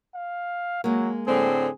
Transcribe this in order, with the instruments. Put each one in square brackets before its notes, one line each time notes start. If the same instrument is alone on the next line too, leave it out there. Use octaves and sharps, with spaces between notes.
[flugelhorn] F5
[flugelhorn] F#3 [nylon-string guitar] G#3 A#3
[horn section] A2 D3 C4 [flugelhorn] G#4